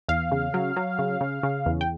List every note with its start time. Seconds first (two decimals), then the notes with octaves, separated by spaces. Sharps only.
0.08 E2 F5
0.32 C#3
0.54 F#3
0.76 F#3
0.99 C#3
1.21 C#3
1.43 C#3
1.66 E2
1.81 G5